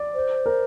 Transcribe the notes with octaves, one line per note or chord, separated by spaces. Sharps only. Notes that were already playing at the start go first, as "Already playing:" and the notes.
Already playing: D5
C5
A#4